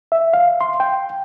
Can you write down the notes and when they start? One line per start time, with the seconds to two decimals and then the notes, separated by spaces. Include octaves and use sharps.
0.12 E5
0.33 F5
0.61 C6
0.80 G5